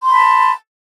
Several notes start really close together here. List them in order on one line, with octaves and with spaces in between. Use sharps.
C6 B5 A5